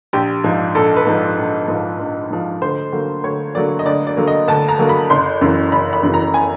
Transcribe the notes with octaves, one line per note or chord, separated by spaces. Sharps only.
A#1 G4
G#2 F3
A#1 A4
B4
G#2 F3
A#1
G#2 F3
A#1
G#2 F3
D2 C5
D3 F#3 A#3
D2 C#5
D3 F#3 A#3 D5
D#5
D2 D5
D5
D3 F#3 A#3
D#5
D2 A5
A#5
D3 F#3 A#3
B5
F#1 C6
F#2 C#3 E3
F#1 B5
B5
F#2 C#3 E3
A#5
G#5